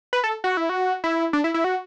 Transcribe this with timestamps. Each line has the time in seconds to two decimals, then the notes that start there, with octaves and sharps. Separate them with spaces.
0.13 B4
0.24 A4
0.44 F#4
0.57 E4
0.69 F#4
1.04 E4
1.33 D4
1.44 E4
1.54 E4
1.64 F#4